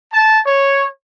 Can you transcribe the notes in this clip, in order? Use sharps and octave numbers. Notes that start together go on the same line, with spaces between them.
A5
C#5